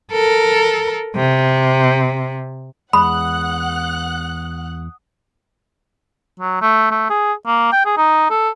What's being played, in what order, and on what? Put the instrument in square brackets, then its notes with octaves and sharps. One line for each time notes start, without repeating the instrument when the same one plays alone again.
[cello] A4 A#4
C3
[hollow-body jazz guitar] E2 G#3 [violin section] F#5 F#6 [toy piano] B5 [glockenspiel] D#6
[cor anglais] F#3
A3
A3
G#4
A#3
G5
G#4
D#4
A4